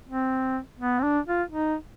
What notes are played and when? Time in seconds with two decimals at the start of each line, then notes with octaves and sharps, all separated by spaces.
0.09 C4
0.80 B3
0.99 C4
1.03 D4
1.27 F4
1.51 D#4